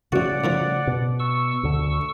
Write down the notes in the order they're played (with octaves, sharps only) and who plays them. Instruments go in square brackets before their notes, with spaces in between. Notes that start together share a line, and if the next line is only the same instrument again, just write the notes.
[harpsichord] A1 F#4 [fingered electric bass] C#3 [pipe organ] D5 F#5
[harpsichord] A2 D#3 F3
[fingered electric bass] B2
[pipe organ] C#6 E6
[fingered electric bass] D2 D3